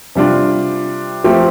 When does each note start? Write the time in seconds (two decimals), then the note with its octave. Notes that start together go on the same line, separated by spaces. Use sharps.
0.15 C3 G3 D4 F4
1.24 F3 A3 C4 G4